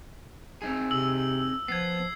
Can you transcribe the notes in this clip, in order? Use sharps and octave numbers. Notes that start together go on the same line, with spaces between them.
C4 D#4 G#4
C3 E6 F#7
F3 B3 G#6 C7